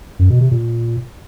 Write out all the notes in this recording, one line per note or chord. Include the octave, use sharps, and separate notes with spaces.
F#2
B2
C3
A#2